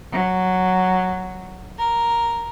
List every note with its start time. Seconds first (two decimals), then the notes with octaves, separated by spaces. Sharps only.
0.10 F#3
1.78 A#4